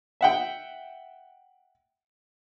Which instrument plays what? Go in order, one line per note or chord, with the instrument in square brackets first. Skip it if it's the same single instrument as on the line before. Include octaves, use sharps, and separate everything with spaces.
[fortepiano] E5 F#5 G5